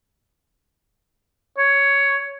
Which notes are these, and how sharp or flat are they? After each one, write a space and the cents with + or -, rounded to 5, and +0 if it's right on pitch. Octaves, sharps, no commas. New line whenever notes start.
C#5 +10